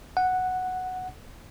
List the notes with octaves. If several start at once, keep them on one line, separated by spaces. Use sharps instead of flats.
F#5